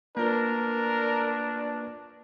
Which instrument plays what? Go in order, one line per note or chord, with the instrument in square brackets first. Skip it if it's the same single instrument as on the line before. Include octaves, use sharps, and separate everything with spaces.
[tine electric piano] A#3 F4 B4 [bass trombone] D4 [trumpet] A#4